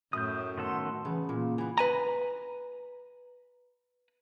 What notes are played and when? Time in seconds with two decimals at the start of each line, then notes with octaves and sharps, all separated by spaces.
0.13 F#2 A2 D#6 G6
0.58 D#3 B3 A4 F#5 C6
1.05 C#3 E3 B3
1.29 A#2 A#3
1.58 E3 B3
1.78 B4 G#5 A#5